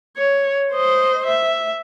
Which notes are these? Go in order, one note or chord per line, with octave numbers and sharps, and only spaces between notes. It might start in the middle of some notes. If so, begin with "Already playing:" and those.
C#5
C5 D#5
E5